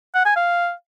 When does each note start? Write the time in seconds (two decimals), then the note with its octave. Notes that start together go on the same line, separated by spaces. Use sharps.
0.14 F#5
0.25 G#5
0.36 F5